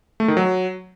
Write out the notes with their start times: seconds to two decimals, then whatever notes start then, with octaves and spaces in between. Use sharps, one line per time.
0.20 A3
0.28 D#3
0.37 F#3